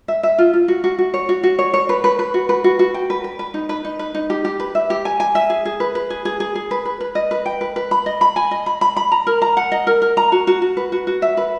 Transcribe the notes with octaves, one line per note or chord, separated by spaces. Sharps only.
E5
E5
F4
F4
F#4
F#4
F#4
C#5
F#4
F#4
C#5
C#5
B4
B4
B4
F#4
B4
F#4
F#4
G5
B4
B4
B4
D#4
B4
D#4
B4
D#4
G4
G4
B4
E5
G4
G#5
G#5
E5
G#4
G#4
B4
B4
G#4
G#4
G#4
G#4
B4
B4
B4
D#5
B4
G5
B4
B4
B5
D#5
B5
G#5
D#5
B5
B5
B5
A#5
A#4
A#5
F#5
D#5
A#4
A#4
A#5
F#4
F#4
F#4
B4
F#4
F#4
E5
B4